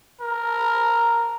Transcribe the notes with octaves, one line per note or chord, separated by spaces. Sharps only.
A#4